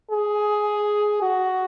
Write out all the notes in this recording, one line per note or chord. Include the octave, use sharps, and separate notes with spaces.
G#4
F#4